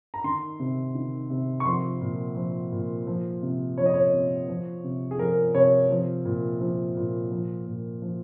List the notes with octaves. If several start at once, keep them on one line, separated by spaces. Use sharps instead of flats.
A#5
D#3 C6
C3
D#3
C3
C#6
F3 C6
A#2
F3
A#2
F3
C3
F3 C#5
D#5
C#5
C3
F3
C3
G#4
F3 A#4
C3 C#5
F3
A#2
F3
A#2
F3
A#2
F3